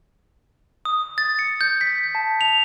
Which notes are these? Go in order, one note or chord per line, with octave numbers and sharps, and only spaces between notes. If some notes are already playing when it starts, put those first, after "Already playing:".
D#6
A6
C#7
G6
B6
A5
F7